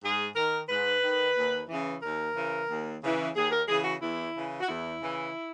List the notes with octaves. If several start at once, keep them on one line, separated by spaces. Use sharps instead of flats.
G#2 G#4
D#3 A#4
G#2 B4
D#3
D#2
C#3 E3
D#2 A#4
C#3 E3
D#2
C#3 E3
D#2 G#4
A#4
C#3 E3 G#4
F#4
E2 E4
C#3 E3
F#4
E2 E4
C#3 E3